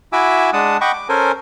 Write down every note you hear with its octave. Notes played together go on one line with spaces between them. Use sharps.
E4 F#4 E5 G#5 D6 E6
G#3 D4 F#5 A5 D#6
D#5 F#5 G5 B5 C#6 D6
D6
C#4 A4 A#4 C5 G#5